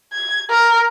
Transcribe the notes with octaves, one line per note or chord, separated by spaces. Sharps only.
G#6
A#4